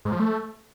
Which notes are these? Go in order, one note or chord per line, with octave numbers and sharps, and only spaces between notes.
G#2
F3
A3